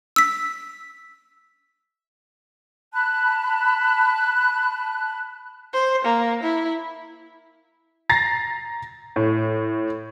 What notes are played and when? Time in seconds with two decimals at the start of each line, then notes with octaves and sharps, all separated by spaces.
0.16 E6 B6
2.93 A5 B5 F#6
5.73 C5
6.04 A#3
6.43 E4
8.09 A#5 A6 A#6 C7
9.16 A2